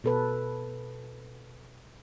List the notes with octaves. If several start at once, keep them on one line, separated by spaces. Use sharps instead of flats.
B2 A4 B4